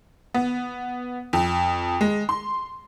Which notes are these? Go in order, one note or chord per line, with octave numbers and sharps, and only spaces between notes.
B3
F2
G#3
C6